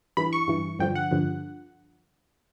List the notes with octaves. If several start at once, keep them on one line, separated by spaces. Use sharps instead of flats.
G2 E3 B5
C#6
G2 E3
G2 D3 F3 G5
F#5
G2 D3 F3